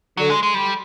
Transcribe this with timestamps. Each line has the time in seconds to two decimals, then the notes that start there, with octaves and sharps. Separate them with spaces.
0.17 D3 F#3
0.30 G#3
0.43 G#3
0.54 G3